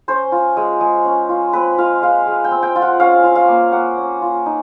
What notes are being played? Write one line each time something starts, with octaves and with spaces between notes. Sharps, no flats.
C#4 C5
F4
G#3
G#3
C#4
F4
C4 B4
F4 F5
G#3 F5
G#3
G5
C4
G5
F4
F#5
C#4 F5
F4
F5
A#3
A#3 F#5
C#4
F4
D#4